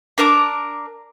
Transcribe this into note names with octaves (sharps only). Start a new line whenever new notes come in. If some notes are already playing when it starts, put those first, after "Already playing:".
D4 A#4 A5 D6